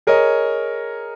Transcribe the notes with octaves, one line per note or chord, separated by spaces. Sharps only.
G#4 A#4 C#5 D#5